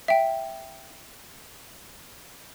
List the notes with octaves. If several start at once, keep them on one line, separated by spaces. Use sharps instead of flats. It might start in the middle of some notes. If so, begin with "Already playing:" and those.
E5 G5